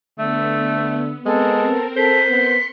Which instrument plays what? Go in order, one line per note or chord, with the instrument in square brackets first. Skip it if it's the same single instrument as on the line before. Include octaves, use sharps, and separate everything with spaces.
[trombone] D3 [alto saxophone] A3 [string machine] B3 [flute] E6
[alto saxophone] G#3 [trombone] B3 [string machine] C4 A#4 [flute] A4
[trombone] A4 [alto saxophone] C5 [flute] B6
[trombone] B3 [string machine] C6 C#7